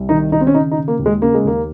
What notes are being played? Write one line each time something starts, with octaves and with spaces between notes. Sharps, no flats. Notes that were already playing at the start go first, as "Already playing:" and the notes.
Already playing: C2
D#3 D#4
D#3 D#4
C4
C#4
C#3 D#4
D#4
C#3
A#3
D#2
G#3
C#3 A#3
G#3
D#2 A#3